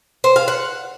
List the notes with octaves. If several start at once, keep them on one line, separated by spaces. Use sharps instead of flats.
C5
F5
F#5